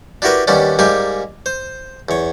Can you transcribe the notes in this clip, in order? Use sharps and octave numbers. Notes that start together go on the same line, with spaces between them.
D4 E4 F#4 G4 A#4 B4
D#2 G3 B3 C#4 D4
G#2 G3 A#3 G4 G#5
C5
E2 C#5